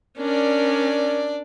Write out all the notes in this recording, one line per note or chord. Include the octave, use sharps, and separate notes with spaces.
C#4 D4 A#4 D5